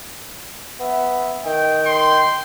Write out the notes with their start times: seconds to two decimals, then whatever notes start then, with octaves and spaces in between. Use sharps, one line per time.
0.80 B3 E5
1.45 D#3 G5
1.86 C6